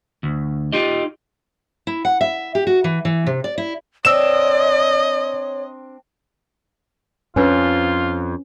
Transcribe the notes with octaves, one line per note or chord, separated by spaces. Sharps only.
D2
D#4 F4 G4 D#5
E4
F#5
E5
G4
F#4
E3
E3
C3
D5
E4
C4 D4 C#5 D#5 E6 E7
F2 C#4 D4 F4 B4